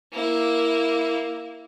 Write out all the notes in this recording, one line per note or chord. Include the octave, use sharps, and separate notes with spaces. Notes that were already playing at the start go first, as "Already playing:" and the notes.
A#3 E4